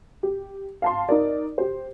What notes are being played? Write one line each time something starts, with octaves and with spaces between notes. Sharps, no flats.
G4
F5 A5 C6
D#4 A#4 D5
G4 C5